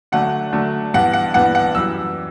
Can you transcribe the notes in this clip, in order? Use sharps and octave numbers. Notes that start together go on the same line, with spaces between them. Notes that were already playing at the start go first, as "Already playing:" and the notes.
D3 F#3 A3 D4 F#5
D3 F#3 A3 D4
G2 E3 B3 D4 F#5
F#5
G2 E3 B3 D4 F#5
F#5
F#2 E3 G3 E6